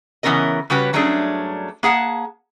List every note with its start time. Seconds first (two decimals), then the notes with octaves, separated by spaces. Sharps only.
0.23 C#3 E3 B3 C#4 A#4 D#5
0.70 C#3 G3 C#4 F#4 G4 B4
0.93 G2 F#3 A3 C#4 D4 G#4
1.83 A#3 G#4 F#5 A5